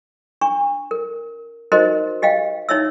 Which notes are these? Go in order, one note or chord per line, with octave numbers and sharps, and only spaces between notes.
D4 C#6
A#4
D#4 F#4 A#4 C5 D#5
G4 D#5 F5 G5
D#4 C#5 E5 E6